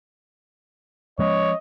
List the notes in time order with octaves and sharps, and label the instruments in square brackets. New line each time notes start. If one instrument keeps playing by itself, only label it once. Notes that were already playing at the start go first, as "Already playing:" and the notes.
[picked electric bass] F3 G#3 C#4 [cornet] C#5 [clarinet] D#5